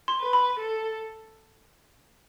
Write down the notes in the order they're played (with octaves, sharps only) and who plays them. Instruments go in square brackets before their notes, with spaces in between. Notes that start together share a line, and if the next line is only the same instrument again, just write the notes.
[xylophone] C6
[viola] B4
[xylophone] B5
[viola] A4